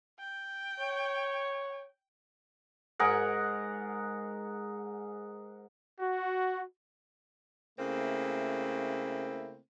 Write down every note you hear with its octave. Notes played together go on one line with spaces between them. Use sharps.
G5
C#5
G#2 G#4 A#4 F#5
F#4
C#3 A3 A#3 C4 E4